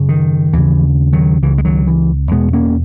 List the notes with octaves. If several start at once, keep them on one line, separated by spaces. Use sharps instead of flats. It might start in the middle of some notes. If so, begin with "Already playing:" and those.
Already playing: F#2 C#3
D#3
D#2 C#3 E3
D#3 F#3
C#2 C#3 E3
G#3
D#3 F#3
E3
E2 B2 G#3 B3
A#3 C#4